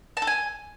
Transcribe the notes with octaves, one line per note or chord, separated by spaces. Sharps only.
A5
A4
G#5